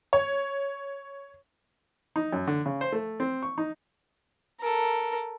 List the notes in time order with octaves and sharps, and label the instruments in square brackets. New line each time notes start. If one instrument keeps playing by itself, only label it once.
[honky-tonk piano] C#5
[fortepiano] D#4
F#2
D3
C#3
C5
A3
C4
C#6
D#4
[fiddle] A4 A#4